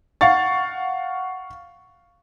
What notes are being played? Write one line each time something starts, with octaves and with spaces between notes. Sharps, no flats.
F5 F#5 C#6 A6